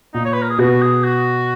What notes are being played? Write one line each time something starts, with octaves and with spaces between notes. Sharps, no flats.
A#2 D#4
C#5
B4
A#4
G#4
B2 F#4
G#4
F#4